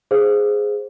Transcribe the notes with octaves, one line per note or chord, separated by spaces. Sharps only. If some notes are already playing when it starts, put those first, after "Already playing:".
G#4 C5 F5